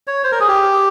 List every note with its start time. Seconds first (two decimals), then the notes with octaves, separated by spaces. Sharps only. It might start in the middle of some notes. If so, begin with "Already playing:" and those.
0.07 C#5
0.24 C5
0.32 A#4
0.40 G#4
0.48 G4